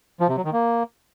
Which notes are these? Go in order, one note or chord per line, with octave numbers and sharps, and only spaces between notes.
F3
C3
F#3
D#3
A#3